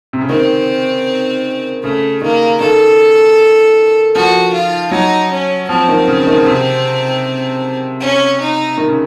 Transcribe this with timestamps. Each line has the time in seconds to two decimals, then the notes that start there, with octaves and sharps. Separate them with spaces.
0.13 C3
0.21 C#3
0.29 D#3 C4
1.83 C#3 A3
2.21 D#3 A#3
2.60 D#3 A4
4.15 F3 F#4
4.53 F4
4.91 F#3 D#4
5.31 C#4
5.69 F3 C4
5.88 D#3
6.08 C#3
6.27 D#3
6.46 C3
8.01 C#4
8.40 D#4
8.78 D#3
8.88 C#3